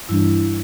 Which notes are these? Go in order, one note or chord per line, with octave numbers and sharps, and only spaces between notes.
G2 E3 G3 D4 E4